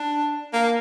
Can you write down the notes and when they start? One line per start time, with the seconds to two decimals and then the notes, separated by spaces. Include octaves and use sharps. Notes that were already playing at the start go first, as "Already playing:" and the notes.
Already playing: D4
0.54 A#3